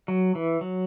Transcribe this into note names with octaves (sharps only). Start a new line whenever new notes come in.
F#3
E3
F#3